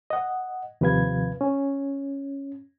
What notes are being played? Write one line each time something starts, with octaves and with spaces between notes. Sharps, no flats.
D#5 F#5
D#2 C3 F3 B4 F5 G#6
C#4